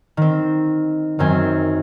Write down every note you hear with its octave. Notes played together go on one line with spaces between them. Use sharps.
D#3 C4
F#2 D#3 C4 G#5